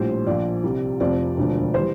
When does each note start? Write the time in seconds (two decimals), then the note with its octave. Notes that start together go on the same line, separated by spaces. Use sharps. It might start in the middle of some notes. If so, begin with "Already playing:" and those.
Already playing: A#1 A2 G3 C5
0.27 A#1 A#2 F3 D5
0.64 C2 C3 G3
1.00 F1 F2 C3 F3 D5
1.37 E1 D2 D3 F3
1.74 E3 G3 C5